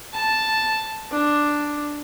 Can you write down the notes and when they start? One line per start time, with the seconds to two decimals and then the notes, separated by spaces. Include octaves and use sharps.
0.13 A5
1.11 D4